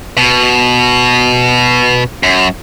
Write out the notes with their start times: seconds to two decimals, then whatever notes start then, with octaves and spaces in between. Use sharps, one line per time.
0.17 B2
2.23 F#2